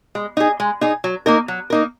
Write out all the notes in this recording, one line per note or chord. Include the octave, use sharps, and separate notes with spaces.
G#3
D#4 G#4
G#3
D#4 G#4
F#3
A#3 D#4 A#4
F#3
A#3 D#4 A#4